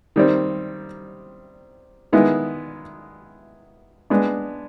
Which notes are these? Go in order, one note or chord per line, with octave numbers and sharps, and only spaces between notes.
D#3 G3 C4
D#3 G#3 B3 E4
G#3 B3 D4